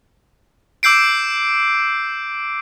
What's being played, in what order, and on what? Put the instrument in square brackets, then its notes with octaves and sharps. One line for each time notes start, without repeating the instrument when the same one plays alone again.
[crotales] D6 E6 G6 C7 D7